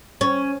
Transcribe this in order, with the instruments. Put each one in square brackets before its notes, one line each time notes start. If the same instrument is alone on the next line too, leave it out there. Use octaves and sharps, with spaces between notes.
[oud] C#4